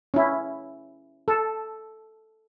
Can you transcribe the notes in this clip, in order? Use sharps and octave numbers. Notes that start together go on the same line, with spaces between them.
C#4 E4
A4